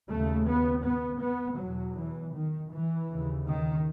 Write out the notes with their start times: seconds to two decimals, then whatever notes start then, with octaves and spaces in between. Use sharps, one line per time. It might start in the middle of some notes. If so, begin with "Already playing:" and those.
0.10 D#2 C#3 A3
0.48 B3
0.85 B3
1.22 B3
1.60 E2 B2 F#3
1.98 E3
2.34 D#3
2.71 E3
3.08 D#2 C#3
3.46 D#3